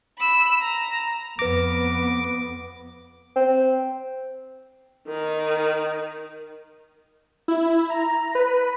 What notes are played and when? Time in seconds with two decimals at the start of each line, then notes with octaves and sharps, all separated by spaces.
0.19 B5 E6
0.62 A#5
1.39 F2 B3 B4 D6 A#6
3.36 C4
5.08 D#3
7.48 E4
7.90 A#5
8.35 B4